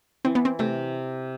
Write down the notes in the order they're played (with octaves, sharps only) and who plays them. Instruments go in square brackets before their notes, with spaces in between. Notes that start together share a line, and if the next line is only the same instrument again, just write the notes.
[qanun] E3 [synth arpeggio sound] C4
[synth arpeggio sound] B3
C4
[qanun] C3 [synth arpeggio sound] A3